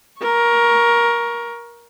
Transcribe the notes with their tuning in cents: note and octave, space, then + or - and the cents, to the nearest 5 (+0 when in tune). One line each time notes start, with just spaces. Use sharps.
A#4 +15 C#6 +0